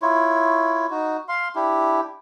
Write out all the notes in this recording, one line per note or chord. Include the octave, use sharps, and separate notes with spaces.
E4 F4 C#5
D#4 F#4
F5 C6
D4 E4 G4